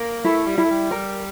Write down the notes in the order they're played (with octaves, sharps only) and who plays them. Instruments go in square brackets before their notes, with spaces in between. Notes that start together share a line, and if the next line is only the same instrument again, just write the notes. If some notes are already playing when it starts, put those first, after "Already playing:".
Already playing: [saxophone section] A#3 [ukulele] A#4
[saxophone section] A3 [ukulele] E4
[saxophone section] G3
[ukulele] E4
[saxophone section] A3
G3
[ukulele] A#4